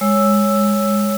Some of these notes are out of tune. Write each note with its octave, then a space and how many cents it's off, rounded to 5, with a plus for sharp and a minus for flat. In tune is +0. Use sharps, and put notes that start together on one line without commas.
G#3 -10 C#5 +0 E6 +0